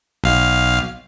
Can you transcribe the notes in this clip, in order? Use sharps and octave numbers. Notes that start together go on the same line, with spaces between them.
B1 F5